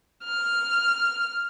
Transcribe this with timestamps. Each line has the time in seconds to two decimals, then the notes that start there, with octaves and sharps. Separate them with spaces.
0.24 F6